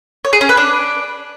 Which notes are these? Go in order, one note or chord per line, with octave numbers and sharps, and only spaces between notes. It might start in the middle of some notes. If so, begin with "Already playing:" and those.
C#5
G#4
C#4
B4
D4